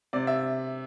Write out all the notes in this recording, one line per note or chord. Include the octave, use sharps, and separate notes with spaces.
C3 D5
E5